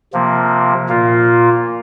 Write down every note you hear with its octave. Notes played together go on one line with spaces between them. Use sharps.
C3 F3 A#3
A#2 A#3 F4